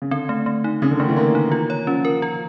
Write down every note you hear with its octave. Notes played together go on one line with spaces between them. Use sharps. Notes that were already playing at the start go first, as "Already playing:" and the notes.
C#3
D3 C4
A3
A3
D#4
C#3 C4
D3
D#3 A3
E3
A3 A#3
D#4
F4
C#5
F3 C#4
A#4
F4